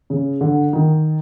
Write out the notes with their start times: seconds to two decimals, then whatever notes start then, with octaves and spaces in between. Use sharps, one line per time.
0.10 C#3
0.41 D3
0.73 D#3